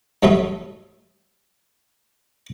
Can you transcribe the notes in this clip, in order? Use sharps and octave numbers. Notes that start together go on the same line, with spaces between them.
G2 F#3 A3 E5 B5 D#6